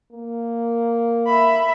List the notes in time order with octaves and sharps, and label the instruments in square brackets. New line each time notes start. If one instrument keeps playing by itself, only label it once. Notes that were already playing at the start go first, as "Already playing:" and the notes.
[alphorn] A#3
[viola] E5 B5